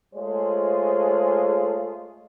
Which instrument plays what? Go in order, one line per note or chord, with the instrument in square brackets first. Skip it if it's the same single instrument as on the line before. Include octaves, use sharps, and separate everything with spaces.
[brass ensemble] G#3 A3 F4 G#4 C5 C#5